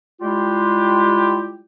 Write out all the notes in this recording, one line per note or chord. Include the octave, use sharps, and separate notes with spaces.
G3 G#3 E4 F4 G4